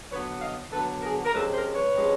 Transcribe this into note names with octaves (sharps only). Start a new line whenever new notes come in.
D3 F#3 B3 B4 C#5
D#5 F5
D3 F#3 B3 A4 B4
G#4 A#4
A#4
C3 F3 G#3 C#4 A4 B4
A#4 C5
B4 C#5
C3 F3 G#3 C#4